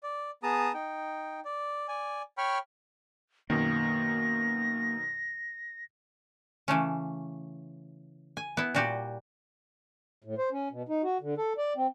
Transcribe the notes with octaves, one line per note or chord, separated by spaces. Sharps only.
D5
B3 G#4 A5 A#5 D#6
D#4 G5
D5
D5 G#5
C#5 G5 B5 C#6 F6
F#2 B2 D#3 A#3 A#6
C#3 E3 A3 C#4
G#5
B3 E4
A#2 G3 F#4 G4 D5
A2
C5
C#4
B2
D#4
F#4
D3
A4
D5
C4